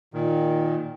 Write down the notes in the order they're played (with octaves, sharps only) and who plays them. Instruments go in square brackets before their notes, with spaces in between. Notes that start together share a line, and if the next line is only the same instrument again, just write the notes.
[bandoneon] A#2 D#3